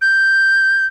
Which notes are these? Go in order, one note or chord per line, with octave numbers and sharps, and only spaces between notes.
G6